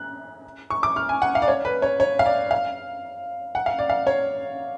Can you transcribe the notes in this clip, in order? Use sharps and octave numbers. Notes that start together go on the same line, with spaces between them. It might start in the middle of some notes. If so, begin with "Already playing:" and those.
Already playing: F#6
C#6
D6
F6
G#5
F#5
F5
D5
C#5
B4
C#5
C#5
F5
D5
F5
F#5
F5
D5
F5
C#5